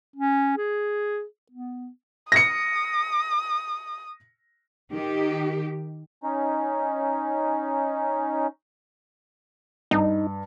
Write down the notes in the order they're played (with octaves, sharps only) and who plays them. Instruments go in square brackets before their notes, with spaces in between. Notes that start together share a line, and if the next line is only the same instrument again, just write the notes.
[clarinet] C#4
G#4
B3
[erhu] D#6 [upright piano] A#6 C#7
[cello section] D#3 G4
[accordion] C#4 D#4
[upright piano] G2 [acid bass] D#4